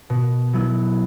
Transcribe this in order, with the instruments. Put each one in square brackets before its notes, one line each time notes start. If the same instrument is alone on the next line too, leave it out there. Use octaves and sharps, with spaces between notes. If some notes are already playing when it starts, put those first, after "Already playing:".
[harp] B2
F#3 B3 E4